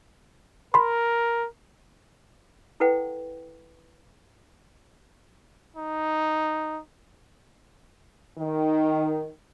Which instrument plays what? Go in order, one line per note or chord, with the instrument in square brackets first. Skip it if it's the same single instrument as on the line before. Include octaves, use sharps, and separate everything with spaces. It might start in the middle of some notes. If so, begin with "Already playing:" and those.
[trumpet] A#4 [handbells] B5 C6
[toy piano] E4 A4 B4 F#5 G5
[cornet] D#4
[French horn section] D#3